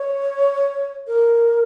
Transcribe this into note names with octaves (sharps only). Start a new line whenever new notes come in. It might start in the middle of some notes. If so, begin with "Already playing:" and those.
Already playing: C#5
A#4